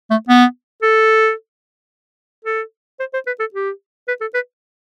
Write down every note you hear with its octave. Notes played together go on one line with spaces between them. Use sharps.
A3
B3
A4
A4
C5
C5
B4
A4
G4
B4
A4
B4